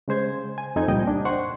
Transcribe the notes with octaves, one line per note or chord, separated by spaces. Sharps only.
C#3 G#3 C5 G#6
G#5
F2 C4 D#4 A4 D#5 G#6
C#2 A#2 G3 D#5 G5
D4
C5 F#5 C6 C#6